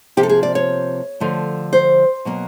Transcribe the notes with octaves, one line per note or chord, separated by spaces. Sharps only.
C3 F3 A#3 G4
A4
G#4
D5
C#5
D3 F3 A3
C5
B2 F#3 A#3